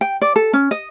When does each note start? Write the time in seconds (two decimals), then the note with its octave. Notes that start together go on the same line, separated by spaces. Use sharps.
0.01 G5
0.22 D5
0.36 A4
0.53 C#4
0.71 D#5